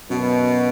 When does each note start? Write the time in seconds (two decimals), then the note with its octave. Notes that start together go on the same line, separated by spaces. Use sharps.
0.10 F#2 B2